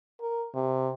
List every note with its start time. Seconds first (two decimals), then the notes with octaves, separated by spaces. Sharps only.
0.21 A#4
0.54 C3